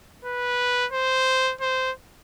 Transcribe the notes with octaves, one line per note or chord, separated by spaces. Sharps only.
B4
C5
C5